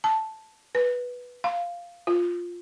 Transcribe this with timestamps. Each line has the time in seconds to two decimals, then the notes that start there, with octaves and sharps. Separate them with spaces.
0.04 A5
0.75 B4
1.44 F5
2.07 F4